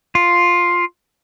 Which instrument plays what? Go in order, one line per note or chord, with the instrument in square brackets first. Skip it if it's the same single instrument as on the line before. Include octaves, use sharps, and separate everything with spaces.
[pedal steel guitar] F4